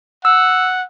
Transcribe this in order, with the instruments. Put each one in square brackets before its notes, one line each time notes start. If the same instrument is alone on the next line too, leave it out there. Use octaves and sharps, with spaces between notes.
[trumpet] F#5 [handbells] E6